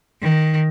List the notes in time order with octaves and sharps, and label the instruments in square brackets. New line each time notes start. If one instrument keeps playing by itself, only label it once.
[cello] D#3